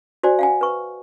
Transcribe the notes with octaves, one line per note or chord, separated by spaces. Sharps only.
F#4 C5 D5 G#5
F5 F#5 G#5
B4 C#6